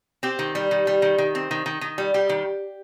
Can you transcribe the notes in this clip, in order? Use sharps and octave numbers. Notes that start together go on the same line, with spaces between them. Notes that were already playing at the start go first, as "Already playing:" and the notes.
C4 G4
D#3
G3
D#3
G3
D#3
D#3
C4
D#3
D#3
D#3
G3
G3 G4
D#3